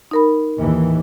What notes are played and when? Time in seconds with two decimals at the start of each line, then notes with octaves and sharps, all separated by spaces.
0.11 D#4 A#4 B5
0.60 D#2 A2 E3